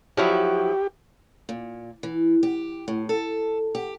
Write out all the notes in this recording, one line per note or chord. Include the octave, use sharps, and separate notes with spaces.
F3 F#3 E4 G4
A#2
E3
G4
A2
A4
G4